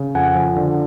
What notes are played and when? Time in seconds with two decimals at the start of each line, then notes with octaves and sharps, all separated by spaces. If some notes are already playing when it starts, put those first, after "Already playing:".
Already playing: C#3
0.15 F2 F#5 G#5
0.35 F3
0.56 D3